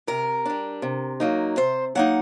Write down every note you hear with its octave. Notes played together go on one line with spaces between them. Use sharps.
C3 A#4
G3 D4
C3
F#3 A#3 D#4
C3 C5
F#3 A#3 D#4 F#5